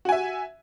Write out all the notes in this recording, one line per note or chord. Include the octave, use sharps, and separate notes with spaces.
F#4 E5 G#5